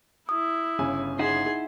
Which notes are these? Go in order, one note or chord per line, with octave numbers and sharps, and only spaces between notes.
E4 D#6
G1 C#3 G#5
D#4 E4 G#4 F#5 C6